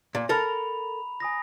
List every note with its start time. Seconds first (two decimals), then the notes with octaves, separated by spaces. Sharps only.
0.15 A#2
0.29 A4 A#4 A#5 B5 F7
1.20 G#5 D#6 A#6